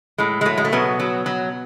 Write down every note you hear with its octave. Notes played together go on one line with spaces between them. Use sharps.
A2 G#3
G#3
F#3 A3
G#3
A3
B2 F#3 B3
F#3
F#3